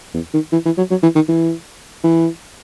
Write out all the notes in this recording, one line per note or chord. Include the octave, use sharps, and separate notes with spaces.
E2
D#3
E3
E3
F#3
F#3
E3
D#3
E3
E3